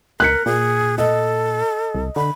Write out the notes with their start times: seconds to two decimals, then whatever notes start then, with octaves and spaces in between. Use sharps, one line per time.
0.20 C#2 A#4 F#6 B6 C#7
0.46 A#2 G#4
0.98 A4 D#5
1.95 C2
2.16 D3 B5